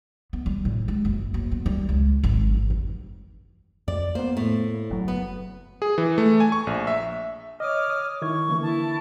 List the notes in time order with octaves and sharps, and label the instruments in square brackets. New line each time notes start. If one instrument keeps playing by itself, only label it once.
[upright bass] B3
G3
A2
G#3
F#1
F#1
B3
G3
C#2
G#1
E3
F2
[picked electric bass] F2 [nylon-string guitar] D5
[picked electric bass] A#3 B3 [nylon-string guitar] C5
[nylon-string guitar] A2
[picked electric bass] F#1 F#3
[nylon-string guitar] B3
[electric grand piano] G#4
E3
A3
G#5
C#6
A#1
E5
[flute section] C#5 D6 F6 [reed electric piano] D#5 D#6
[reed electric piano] D#6
[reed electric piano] D#3 E4 G#6 [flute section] C#6
[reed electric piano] D3 E3 A#3
[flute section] E4 A5